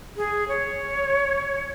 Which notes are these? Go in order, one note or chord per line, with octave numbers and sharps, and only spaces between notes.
G#4
C#5